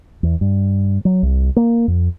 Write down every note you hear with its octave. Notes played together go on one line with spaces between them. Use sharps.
E2
G2
F#3
C2
A#3
F2